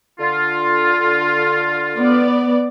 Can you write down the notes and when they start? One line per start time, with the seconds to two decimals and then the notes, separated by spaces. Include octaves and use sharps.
0.19 D3 F4
1.98 B3 D5